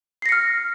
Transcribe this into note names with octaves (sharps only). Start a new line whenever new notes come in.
F6 A#6 C7 C#7